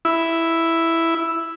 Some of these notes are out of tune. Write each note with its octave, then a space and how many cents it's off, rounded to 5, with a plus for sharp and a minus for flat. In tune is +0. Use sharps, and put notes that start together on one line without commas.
E4 +0